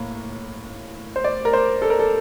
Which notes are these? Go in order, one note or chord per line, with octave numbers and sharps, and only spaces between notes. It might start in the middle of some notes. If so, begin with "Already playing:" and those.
Already playing: A2 A#3
C5
D5
A#4
C5
A4
A#4
A4